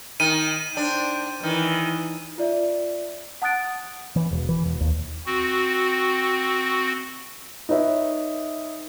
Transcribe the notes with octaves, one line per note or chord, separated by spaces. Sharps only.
D#3 D#7
D4 C5 G5
D#3 E3
F4 D5 E5
F#5 A5 D#6 F#6 A6 D7
E3
E1
E3
E1
D#2
C4 F#4
D#4 B4 C#5 E5